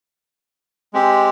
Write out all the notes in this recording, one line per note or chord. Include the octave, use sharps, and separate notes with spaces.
G#3 C4 G4